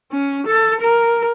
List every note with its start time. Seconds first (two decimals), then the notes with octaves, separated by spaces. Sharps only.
0.12 C#4
0.47 A4
0.81 A#4